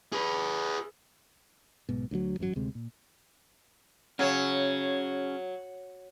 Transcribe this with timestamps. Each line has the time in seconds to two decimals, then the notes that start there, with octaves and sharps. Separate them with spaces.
0.12 G#4 B4
1.89 B1 G#2 B2
2.11 D2 D#3 F#3
2.39 G#1 F#2 A2 F#3
2.56 D2 C3 G#3
2.75 A#2
4.19 F#3 C#4 G#4